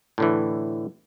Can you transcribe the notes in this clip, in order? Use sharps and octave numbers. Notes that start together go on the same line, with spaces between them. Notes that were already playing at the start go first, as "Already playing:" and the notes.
A2 D3 E3